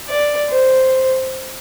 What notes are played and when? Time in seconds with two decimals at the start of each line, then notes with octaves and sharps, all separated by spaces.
0.09 D5
0.50 C5